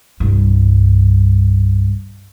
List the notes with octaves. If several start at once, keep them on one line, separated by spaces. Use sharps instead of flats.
C2 G2